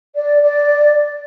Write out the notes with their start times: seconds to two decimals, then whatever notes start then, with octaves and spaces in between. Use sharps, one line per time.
0.16 D5
0.42 D5